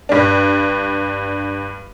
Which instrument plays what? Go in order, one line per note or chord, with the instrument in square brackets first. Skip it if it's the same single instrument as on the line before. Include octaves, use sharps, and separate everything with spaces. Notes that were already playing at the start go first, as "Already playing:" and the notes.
[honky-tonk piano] G2 D4